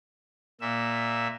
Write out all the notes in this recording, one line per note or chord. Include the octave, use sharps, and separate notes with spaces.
A#2 E5